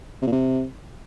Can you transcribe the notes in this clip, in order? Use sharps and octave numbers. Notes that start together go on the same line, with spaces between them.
C3
A#2
C3